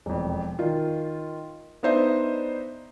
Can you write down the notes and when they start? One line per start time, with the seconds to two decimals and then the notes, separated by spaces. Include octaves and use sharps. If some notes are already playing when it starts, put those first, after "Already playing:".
0.06 E1 F2
0.59 D#3 F4
1.83 B3 D4 D#4 C5 D#5 E5